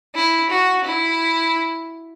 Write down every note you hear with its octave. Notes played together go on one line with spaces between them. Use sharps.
E4
F#4
E4